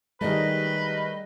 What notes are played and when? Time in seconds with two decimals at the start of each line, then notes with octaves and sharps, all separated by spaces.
0.21 D#3 G3 A3 G#4 B4 D#5